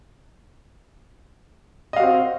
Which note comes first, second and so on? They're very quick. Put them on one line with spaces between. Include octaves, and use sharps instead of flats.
D#5 F5 F#4 C4